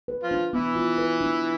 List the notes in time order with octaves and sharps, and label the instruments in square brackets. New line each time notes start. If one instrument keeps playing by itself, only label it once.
[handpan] B4
[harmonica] F3 F4
[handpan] D4
[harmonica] E3 E4 [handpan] B3
[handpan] F4
B4
D4